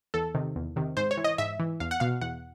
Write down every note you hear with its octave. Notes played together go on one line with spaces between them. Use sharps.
E2 A4
C3 D#3
E2
C3 D#3
G#2 C5
C#5
E3
D#5
G#2 E5
E3
E2 F5
F#5
B2 F5
E2 F#5